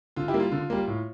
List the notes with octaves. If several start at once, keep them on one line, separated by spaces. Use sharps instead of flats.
D3 F4
E4 G4
G3 A#3
F4
D3
G3 A#3
A2